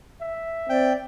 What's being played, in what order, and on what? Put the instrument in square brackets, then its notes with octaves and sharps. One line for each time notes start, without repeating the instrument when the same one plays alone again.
[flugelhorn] E5
[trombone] C4 [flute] D5 [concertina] G5